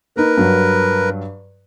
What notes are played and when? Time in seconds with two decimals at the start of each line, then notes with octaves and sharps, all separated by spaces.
0.17 A#3 D#4 A#4 B4
0.37 G2 F#3